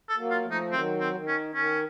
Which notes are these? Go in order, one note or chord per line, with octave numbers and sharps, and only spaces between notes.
A4
F#3 A#3
F4
F3 A3
D#4
D#3 F#3 C4
C4
D#3
C#4
D#3 C#4